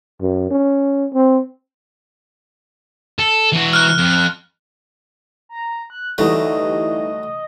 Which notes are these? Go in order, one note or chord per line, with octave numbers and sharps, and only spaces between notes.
F#2
C#4
C4
A4
E3 F#4
F6 F#6
F2
A#5
F#6
D2 E3 F#3 G3 A3 D#4 A4 D#5